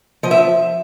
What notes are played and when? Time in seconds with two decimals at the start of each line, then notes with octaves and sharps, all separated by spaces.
0.23 F3 D#5
0.31 E5